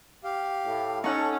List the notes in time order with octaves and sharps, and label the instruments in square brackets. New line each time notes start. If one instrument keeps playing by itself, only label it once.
[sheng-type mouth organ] G4 F5
[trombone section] A2
[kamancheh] C#4 [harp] D#4 F#5 [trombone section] A4 [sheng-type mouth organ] C#6